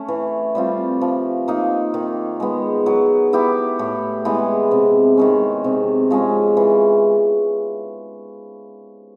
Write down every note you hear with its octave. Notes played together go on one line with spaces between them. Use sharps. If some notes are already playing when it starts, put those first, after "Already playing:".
Already playing: A3 C#4
E3
G3 C4 F4
F3
A#3 D#4
D#3
G#3 B3
F#3
B3 E4 G4
A2
E3 G#3 B3
C3
D#3 G#3 C#4
C3
F3 G#3 C#4
E3